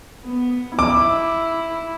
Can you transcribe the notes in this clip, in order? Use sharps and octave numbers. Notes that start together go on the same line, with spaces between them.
B3
E4 D6